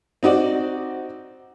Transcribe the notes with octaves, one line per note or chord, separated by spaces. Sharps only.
C4 D#4 F#4 D5